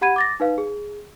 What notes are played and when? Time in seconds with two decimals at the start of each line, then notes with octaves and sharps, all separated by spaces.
0.01 G4 F#5 B5 G#6 D#7
0.16 D6 A6 A#6
0.40 D#4 B4 F5
0.58 G#4